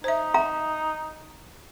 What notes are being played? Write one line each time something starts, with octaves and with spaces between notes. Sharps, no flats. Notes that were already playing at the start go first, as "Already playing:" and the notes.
D#4 C5 E5
E5 A#5